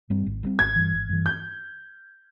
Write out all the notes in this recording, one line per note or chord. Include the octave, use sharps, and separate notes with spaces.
G2 G3 C4
G#1
G2 G3 C4
G#1 G#6
G2 E3
G#1
G2 E3
G6